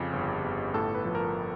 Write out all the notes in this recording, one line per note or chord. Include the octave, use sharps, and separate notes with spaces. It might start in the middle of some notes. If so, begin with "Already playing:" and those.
Already playing: F2 C#3 G4
G1
G1
A2 A4
B4
F3
A#4